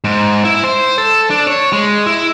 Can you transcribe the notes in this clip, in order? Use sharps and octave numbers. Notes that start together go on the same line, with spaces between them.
G#2
E4
C5
A4
D4
C#5
G#3
E4